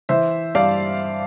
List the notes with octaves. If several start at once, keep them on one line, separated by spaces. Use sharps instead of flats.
E3 C5 E5
G2 D5 F5